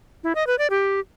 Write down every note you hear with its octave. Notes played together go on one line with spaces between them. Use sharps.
E4
D#5
B4
D5
G4